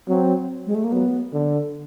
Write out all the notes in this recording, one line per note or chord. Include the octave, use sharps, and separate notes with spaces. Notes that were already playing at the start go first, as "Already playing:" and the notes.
F#3 C4
G#3
A3
A#3
F#3 B3
D3